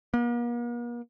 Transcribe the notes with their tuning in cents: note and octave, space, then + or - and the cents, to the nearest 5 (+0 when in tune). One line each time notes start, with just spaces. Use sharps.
A#3 +45